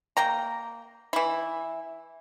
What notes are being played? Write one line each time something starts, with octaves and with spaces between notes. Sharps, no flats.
A#3 G5 A#5
E3 E4